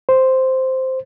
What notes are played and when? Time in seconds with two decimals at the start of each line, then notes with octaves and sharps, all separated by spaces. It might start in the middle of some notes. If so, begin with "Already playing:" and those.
0.09 C5